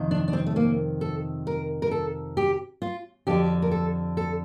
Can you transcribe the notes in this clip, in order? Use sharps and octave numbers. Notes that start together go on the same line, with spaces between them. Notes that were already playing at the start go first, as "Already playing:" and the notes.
Already playing: F2 C3 D#3
D4
D4
C4
A3
A#3
A4
A#4
A#4
A4
G4
F4
F2 D3 G4
A#4
A4
A4